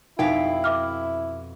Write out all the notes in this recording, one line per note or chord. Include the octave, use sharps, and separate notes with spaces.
F2 B2 D#4 E4 F5 G5 B6
E5 D6 F6